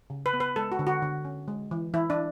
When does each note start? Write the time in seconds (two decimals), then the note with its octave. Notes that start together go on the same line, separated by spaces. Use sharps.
0.10 C#3
0.26 B4
0.34 B3
0.40 B4
0.56 G#3 A4
0.72 F#4
0.79 D3
0.87 F#4
1.02 D3
1.25 C#4
1.48 G#3
1.71 E3
1.94 E3 E4
2.10 D4